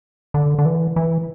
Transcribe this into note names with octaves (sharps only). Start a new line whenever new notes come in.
D3
D3
E3
E3